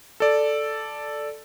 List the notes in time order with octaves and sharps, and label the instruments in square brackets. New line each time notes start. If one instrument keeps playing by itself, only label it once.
[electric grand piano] A4 D5